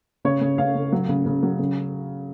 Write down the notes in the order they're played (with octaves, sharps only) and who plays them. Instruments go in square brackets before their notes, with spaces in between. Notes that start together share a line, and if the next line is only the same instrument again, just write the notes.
[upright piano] C#3 C#5
C#3
C#3 F5
C#3
F#3
C#3
C#3
F#3
C#3